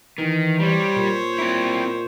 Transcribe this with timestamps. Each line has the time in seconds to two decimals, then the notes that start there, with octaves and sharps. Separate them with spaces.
0.18 D#3 E3
0.60 G3 C5 C#5
0.96 A#2
1.39 C4 E4